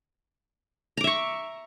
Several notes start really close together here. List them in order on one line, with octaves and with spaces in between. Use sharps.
A#5 D6 E5 C#6